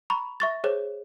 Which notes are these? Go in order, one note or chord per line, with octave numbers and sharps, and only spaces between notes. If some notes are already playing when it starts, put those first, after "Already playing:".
A#5 B5 C#6
E5 C#6 A6
G#4 C5 C#5